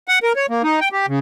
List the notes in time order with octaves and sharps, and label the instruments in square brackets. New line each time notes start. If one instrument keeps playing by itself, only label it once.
[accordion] F#5
A#4
C#5
A#3
D#4
G5
G4
C#3